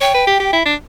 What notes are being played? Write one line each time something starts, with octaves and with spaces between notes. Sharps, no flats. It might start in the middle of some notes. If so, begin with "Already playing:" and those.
C#5 G5
B4
G4
G4
E4
D4